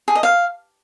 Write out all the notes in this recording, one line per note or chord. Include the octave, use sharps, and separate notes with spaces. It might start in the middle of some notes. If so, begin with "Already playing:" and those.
G#4
D#5
F5